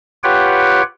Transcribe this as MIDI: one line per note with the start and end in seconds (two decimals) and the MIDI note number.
0.24 0.82 65
0.24 0.82 67
0.24 0.82 71
0.24 0.82 73
0.24 0.82 78
0.24 0.82 79